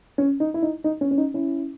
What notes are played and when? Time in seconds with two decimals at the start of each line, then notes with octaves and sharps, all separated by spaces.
0.18 C#4
0.40 D#4
0.54 E4
0.62 D#4
0.84 D#4
1.01 C#4
1.11 C#4
1.18 D#4
1.34 C#4 E4